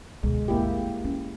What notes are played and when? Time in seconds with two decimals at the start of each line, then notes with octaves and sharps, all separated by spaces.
0.23 D2 B2 G#3
0.48 G#1 D2 A#3 E4 G4
1.04 C#4